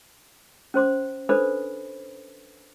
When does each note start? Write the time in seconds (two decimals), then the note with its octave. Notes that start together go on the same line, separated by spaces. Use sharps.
0.74 C#4 C5 C6 D6
1.29 D4 A4 B4 C5 B5 D6